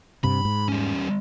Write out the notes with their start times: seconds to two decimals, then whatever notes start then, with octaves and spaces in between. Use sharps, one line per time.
0.24 G2 C3 B5
0.45 G#2
0.69 G3 C#4